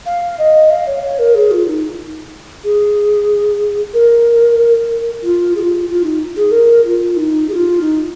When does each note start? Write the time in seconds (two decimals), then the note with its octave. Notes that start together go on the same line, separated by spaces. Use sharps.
0.06 F5
0.39 D#5
0.70 F5
0.87 C#5
1.03 C#5
1.19 A#4
1.35 G#4
1.51 F4
1.68 D#4
2.64 G#4
3.94 A#4
5.23 F4
5.55 G#4
5.60 F4
5.88 F4
6.03 D#4
6.36 G#4
6.51 A#4
6.84 F4
7.17 D#4
7.49 G#4
7.53 F4
7.81 D#4